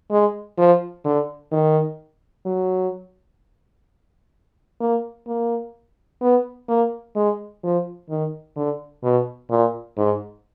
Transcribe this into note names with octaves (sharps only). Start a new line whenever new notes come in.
G#3
F3
D3
D#3
F#3
A#3
A#3
B3
A#3
G#3
F3
D#3
D3
B2
A#2
G#2